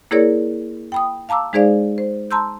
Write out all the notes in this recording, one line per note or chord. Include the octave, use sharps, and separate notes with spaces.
A#3 E4 G#4 A#4 C#5 D5
G5 B5 D#6
F5 A5 A#5 D6 E6
G#3 D#4 G#4 C5 D5 F5
C5
A5 A#5 C6 E6 G6